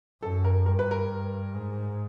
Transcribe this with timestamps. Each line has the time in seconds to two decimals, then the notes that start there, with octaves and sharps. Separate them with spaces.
0.23 F#2 A4
0.44 A#4
0.66 G2 A#4
0.79 B4
0.91 A#4
1.54 G#2